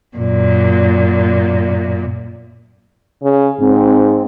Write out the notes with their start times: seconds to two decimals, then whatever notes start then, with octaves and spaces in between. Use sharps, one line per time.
0.17 F#2 A#2
3.23 C#3
3.60 G#2 C4